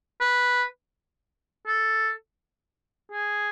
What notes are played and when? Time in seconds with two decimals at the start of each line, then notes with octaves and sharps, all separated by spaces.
0.21 B4
1.67 A4
3.12 G#4